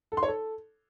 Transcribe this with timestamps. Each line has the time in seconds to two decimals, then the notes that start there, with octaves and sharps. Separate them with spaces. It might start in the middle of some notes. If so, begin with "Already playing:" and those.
0.12 A4
0.17 C6
0.23 C#5
0.28 A4